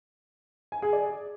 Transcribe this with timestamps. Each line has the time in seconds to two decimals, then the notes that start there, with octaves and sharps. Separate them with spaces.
0.72 G#5
0.82 G#4
0.93 D5